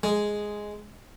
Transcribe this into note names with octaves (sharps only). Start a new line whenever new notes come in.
G#3